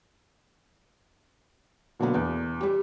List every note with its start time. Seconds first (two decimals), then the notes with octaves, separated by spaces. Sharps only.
2.00 B2 D3 F#3 A#3 B3
2.15 E2
2.61 G3 G4